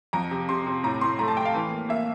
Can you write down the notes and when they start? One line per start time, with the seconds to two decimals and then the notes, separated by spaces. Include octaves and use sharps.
0.13 F2 A#5
0.31 C3
0.49 C3 C6
0.67 C3
0.84 A2 A#5
1.01 A2 C6
1.19 A3 A#5
1.28 A5
1.37 A3 G5
1.45 F5
1.54 E3
1.71 A#3
1.89 A#3 E5